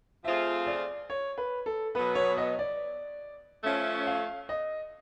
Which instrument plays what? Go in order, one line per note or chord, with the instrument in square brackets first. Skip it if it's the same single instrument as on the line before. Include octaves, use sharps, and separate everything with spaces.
[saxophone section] F3 A3 C4 F4 G#4 [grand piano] E5
[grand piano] D5
C#5
B4
A4
[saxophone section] B2 F#3 B3 [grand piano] B4
[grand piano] C#5
D#5
D5
[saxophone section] F3 A3 C#4 [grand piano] E5
[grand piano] F5
D#5